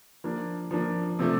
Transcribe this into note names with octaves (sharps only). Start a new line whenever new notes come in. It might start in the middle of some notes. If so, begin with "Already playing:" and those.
F3 A#3 D4
F3 A#3 D4
C3 F3 A3